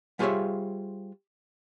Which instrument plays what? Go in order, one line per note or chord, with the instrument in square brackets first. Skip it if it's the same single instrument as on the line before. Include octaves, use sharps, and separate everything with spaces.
[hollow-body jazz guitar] G3 F4 G#4 C5 C#5 E5